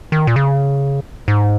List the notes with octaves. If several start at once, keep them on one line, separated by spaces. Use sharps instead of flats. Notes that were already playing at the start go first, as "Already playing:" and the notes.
D#3
A#2
C#3
G#2